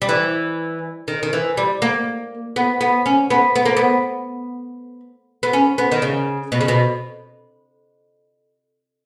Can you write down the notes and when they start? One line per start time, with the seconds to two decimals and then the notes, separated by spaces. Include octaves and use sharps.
0.02 G3
0.09 E3
1.08 D#3
1.23 D#3
1.33 E3
1.57 G3
1.82 A#3
2.56 B3
2.81 B3
3.06 C#4
3.30 B3
3.56 B3
3.66 A#3
3.77 B3
5.43 B3
5.53 C#4
5.78 B3
5.92 D#3
6.02 C#3
6.52 B2
6.61 C#3
6.68 B2